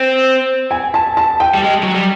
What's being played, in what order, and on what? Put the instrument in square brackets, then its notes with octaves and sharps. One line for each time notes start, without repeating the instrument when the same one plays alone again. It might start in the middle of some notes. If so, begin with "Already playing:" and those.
Already playing: [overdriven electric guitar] C4
[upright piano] G#5
A5
A5
G5
[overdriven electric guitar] G3
G#3
F#3
G3